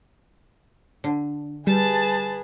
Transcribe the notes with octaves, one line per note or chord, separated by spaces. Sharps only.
D3
G3 G#4 B4 A5